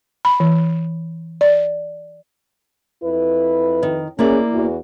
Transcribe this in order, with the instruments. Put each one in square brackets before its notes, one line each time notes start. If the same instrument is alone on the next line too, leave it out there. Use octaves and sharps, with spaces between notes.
[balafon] B5
E3
D5
[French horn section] F2 E4 B4
[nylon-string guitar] D#3
[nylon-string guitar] A#3 E4 D5 [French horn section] C#4 G#4
[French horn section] E2 E3 F#4